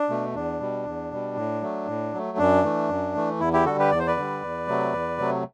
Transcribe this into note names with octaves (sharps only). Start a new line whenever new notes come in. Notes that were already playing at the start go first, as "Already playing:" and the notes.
Already playing: D4
B2 A3
E2 D4
B2 G3
E2
B2 G3
A2
F#3 A3
A2
F#3 A3
F#2 D4
E3 A3
F#2
E3 A3
E2 E4
E4 G4
D3 G3 F#4 A4
G4 B4
E2 D5
C5
B4 D5
D3 G3
E2
C3 F#3 A3
E2
C3 F#3 A3